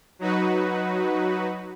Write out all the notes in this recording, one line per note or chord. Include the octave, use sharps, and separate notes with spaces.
F#3 D#4 F#4 B4